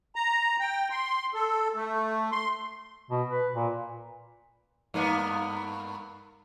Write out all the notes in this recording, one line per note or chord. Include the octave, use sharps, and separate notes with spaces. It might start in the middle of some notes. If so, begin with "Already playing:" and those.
A#5
G5
C6
A4
A3
C6
B2
B4
A#2
G2 A#3 B3